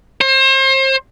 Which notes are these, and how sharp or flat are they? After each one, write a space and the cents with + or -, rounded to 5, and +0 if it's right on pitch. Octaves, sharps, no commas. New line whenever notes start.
C5 +35